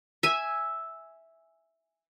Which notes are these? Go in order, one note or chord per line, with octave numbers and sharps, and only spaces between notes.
E5 G#5